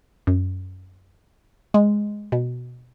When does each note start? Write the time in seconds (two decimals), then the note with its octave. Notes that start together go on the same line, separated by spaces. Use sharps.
0.27 F#2
1.74 G#3
2.32 B2